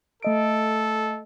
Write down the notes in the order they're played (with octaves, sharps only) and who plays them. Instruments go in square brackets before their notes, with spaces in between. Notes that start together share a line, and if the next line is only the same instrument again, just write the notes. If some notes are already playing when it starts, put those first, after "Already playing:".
[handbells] A3 D#5 D7 [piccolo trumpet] A4